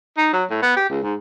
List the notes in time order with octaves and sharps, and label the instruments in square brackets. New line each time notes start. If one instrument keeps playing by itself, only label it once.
[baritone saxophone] D#4
F#3
A2
B3
G4
C#2
G#2